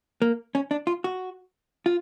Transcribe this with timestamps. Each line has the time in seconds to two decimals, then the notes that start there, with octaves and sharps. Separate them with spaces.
0.22 A#3
0.55 C#4
0.71 D4
0.87 F4
1.04 F#4
1.86 F4